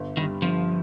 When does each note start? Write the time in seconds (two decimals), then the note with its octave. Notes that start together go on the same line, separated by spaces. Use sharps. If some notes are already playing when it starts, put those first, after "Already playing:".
Already playing: G1
0.17 G2 D#3 G3
0.42 G1 F3